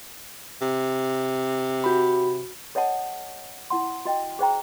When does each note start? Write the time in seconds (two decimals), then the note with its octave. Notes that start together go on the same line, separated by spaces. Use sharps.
0.62 C3
1.84 F#4 B5
2.75 A4 C#5 D#5 F#5 A5
3.70 E4 F#5 C6
4.05 F#4 D#5 G5
4.39 G#4 C5 G5 A#5